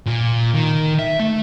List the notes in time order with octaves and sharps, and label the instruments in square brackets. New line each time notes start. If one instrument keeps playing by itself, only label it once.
[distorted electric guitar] A#2
D#3
E5
A3